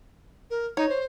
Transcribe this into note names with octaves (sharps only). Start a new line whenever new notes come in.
A#4
D#4 C#5
C5